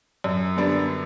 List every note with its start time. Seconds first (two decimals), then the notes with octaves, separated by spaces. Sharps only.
0.24 F#2
0.57 D3 G3 B3 D4